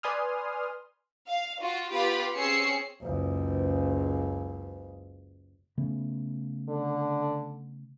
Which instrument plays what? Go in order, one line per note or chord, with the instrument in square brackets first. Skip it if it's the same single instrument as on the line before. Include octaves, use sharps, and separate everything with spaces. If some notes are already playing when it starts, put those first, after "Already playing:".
[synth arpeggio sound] B4 D5 G#5 C6 D#6 F6
[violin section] F5
F4 F#4
B3 F4 G4 B4 B5 B6
C4 C#4 G#4 E6 C7 C#7
[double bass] F#1 C#2
[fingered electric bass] C#3 A3 B3
[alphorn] D3